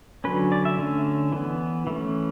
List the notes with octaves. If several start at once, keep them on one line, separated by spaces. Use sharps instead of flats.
D3 F#3 C#4 B4
D5
E5
D3 A3 C#4
E3 B3
E3 A3 C#4